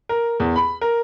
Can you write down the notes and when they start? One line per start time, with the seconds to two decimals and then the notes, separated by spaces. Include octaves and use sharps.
0.09 A#4
0.40 E2
0.56 B5
0.81 A#4